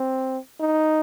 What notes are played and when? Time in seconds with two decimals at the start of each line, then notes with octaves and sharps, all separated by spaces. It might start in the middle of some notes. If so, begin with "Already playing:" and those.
Already playing: C4
0.60 D#4